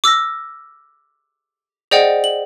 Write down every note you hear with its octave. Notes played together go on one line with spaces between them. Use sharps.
D6 E6 F6 A#6
G#4 C5 D5 D#5 F#5 G5
F#7